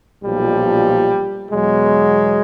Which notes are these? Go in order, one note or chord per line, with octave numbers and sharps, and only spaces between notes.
B1 A#2 F3 G3
E2 B2 F#3 G#3